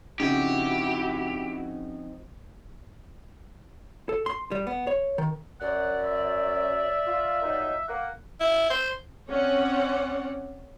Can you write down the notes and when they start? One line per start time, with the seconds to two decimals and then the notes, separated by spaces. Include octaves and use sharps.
0.20 C#3 F3 C4 D#4 E4 F#4 G4
4.09 A4
4.26 C6
4.51 G3
4.67 B3
4.87 C#5
5.18 D#3
5.60 F#2 D5 F#5
6.05 E5
7.05 F4
7.42 A#2 F#3 D#4
7.88 A#3 F#5
8.40 E4
8.70 C5
9.30 C4 C#4 C#5 D5 F#5